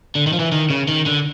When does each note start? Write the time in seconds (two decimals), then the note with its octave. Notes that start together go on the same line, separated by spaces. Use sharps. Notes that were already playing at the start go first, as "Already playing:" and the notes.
0.15 D3
0.27 D#3
0.33 F3
0.39 E3
0.52 D#3
0.70 C#3
0.88 D#3
1.06 D3